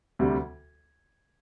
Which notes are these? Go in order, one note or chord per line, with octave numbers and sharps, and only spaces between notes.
D2 C3 G3